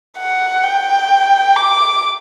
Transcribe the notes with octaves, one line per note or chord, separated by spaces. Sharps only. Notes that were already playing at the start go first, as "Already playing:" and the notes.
F#5
G5
D6